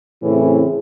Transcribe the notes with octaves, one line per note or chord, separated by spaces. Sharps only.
A2 C#3 E3 C4 G#4